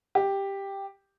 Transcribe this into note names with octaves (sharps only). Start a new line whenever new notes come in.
G4